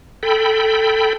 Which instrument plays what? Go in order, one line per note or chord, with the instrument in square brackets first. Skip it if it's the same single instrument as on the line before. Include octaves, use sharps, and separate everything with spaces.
[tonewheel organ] A4 G5 B5